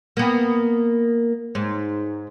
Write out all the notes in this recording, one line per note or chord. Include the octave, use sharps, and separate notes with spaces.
A#3 B3
G#2